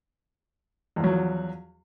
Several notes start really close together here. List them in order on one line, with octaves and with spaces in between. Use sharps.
E2 F3 F#3